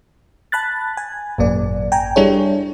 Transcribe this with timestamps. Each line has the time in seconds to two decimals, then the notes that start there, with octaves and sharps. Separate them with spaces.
0.52 A5 B5 F#6 A6
0.97 G#5
1.38 G#1 F#2 A#2 A#3 D5
1.92 G5 G#5 A#5
2.16 G3 D4 E4 G#4 A4 C#5